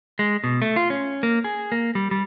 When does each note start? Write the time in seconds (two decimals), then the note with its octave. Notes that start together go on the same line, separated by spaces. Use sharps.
0.19 G#3
0.44 B2
0.62 A3
0.76 F4
0.90 C#4
1.23 A#3
1.44 G#4
1.72 A#3
1.95 G3
2.11 G3